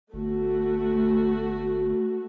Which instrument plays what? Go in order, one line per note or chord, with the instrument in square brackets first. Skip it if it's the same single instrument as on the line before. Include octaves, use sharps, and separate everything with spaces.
[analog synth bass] G1 [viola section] A3 F#4